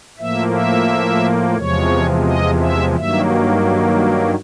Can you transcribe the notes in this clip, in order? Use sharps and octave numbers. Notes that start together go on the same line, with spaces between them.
A2 F3 A#3 E5
E5
E2 C3 F3 G#3 C#5
D#5
E5
G2 D#3 F#3 A#3 E5